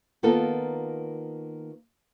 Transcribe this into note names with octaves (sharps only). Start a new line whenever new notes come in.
D#3 A#3 B3 F4 A4